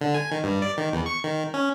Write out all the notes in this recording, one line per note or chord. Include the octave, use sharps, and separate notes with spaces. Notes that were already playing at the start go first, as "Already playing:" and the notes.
D3
G#5
D#3
G2
D5
D#3
E2
C#6
D#3
C#4